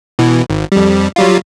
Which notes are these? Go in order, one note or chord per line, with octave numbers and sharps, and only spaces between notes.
B2 E3
G#1
F2 G3
F#3 G3 F4